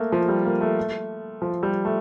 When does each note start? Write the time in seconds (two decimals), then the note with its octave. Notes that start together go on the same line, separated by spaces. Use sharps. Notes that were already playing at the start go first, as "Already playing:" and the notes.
Already playing: A3 A#3
0.12 F3
0.28 G3
0.45 A#3
0.61 A3
1.42 F3
1.63 G3
1.85 A3